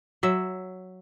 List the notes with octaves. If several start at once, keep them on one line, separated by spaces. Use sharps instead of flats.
F#3 E5